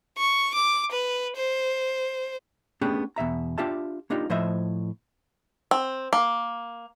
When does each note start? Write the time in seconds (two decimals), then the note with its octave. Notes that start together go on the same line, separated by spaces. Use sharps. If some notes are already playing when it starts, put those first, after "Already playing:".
0.18 C#6
0.55 D6
0.92 B4
1.36 C5
2.81 A3 B3 C#4 D4 G4 G#4
3.16 E2 B2 E5 A#5
3.58 D4 F4 G4 E5 A5
4.10 A#3 D4 D#4 F4 G4
4.30 A2 F3 C5 D#5 E5
5.71 C4
6.13 A#3